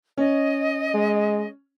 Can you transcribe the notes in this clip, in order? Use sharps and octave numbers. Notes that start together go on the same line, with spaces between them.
C#4 D#5
G#3